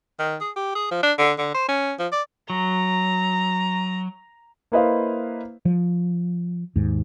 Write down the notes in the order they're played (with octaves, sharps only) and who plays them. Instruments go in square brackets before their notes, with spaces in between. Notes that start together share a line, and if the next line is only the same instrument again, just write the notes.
[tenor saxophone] D#3
G#4
G4
G#4
F3
D4
D3
D3
C5
C#4
F3
D5
[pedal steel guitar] F#3 [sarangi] A#5
[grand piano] A#3 E4 B4 C5 D#5 F5
[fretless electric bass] F3
D#2 G#2